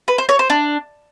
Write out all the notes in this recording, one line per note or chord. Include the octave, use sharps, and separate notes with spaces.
B4
C5
C#5
C5
D4